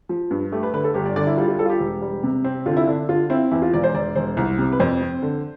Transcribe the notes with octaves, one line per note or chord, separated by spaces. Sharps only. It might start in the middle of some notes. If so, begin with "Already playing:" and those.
F3
G2
A3 G4
B4
D3 B4
A4
G1 G4
D5
D3 D5
E4
G3 F4
F4
G3 A4
F4
G4
E1
G3
C3
C4
D3 F4
E4
D3 D4
D3 F4
C4 E4
E2 E4
F4
E1 D5
C5
E1 D5
E1 C5
C2
C3
B4
F2 C5
C4
D3